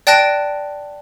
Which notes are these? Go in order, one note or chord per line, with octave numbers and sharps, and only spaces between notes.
D5 G5 A5 F#6 A#6 D7